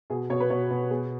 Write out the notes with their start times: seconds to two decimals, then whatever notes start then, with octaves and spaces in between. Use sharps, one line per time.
0.10 B2 G#4
0.30 B2 C#5
0.40 B4
0.50 B2 C#5
0.70 B2
0.91 B3 G#4